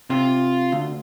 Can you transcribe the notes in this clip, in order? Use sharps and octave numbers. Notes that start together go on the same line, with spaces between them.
C3 F4
D2